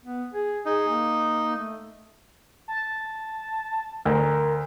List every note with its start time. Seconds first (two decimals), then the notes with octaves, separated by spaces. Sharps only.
0.05 B3
0.34 G#4
0.66 D#4 G#4
0.89 A#3
1.57 A3
2.68 A5
4.05 D2 A#4